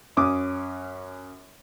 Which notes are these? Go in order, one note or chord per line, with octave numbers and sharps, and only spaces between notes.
F#2 C#4 D6 D#6